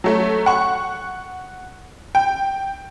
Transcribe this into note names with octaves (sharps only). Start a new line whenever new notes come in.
F#3 A3
F#5 C#6
G5